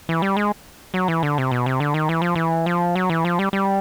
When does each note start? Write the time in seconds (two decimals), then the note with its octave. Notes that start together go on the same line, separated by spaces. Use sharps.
0.09 E3
0.22 G3
0.37 G#3
0.94 F#3
1.08 E3
1.23 D3
1.38 C3
1.51 B2
1.66 C3
1.80 D3
1.94 D#3
2.09 E3
2.22 F3
2.36 E3
2.66 F3
2.96 F#3
3.10 E3
3.25 F3
3.39 G3
3.53 G3